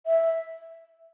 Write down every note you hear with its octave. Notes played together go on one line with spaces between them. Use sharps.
E5